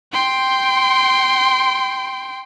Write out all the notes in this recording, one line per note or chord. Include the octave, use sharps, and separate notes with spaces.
G5 C6